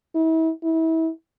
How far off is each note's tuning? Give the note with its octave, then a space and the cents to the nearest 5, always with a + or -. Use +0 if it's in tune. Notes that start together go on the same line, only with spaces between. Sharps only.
E4 -35
E4 -30